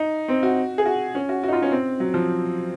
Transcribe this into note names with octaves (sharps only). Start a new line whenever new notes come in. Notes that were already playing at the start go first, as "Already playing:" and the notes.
Already playing: D#4
C4
F#4
G#4
F#4
C#4
F#4
F#4
D#4
F4
C#4
C4
F#3
F3